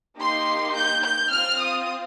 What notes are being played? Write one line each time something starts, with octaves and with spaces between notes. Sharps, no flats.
A#3 D#4 G4 C6
G6
G6
C4 F4 F6
D#6